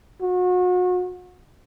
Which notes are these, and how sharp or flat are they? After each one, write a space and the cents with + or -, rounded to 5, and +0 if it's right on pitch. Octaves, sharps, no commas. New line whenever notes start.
F#4 -35